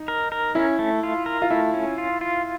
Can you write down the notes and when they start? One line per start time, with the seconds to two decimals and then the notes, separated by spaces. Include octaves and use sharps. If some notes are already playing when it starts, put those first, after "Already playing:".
Already playing: D#4
0.08 A#4
0.32 A#4
0.55 C#4 E4
0.79 A3
1.03 F4
1.26 A#4
1.42 F4
1.50 A3 E4
1.74 C#4
1.98 F4
2.21 F4